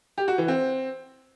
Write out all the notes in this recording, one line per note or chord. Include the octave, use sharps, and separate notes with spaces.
G4
F#4
E3
C4